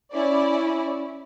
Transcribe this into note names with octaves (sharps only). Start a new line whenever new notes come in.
C#4 E4 D5